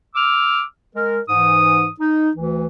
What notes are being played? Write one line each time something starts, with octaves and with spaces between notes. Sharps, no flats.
D6 E6 F6
G#3 A#4
G#2 E3 D#6
D#4
D2 E3